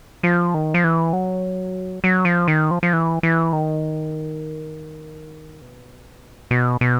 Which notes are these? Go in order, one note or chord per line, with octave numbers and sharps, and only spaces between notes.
F3
D#3
F3
E3
F#3
F#3
F3
D#3
F3
F3
E3
E3
D#3
B2
B2
B2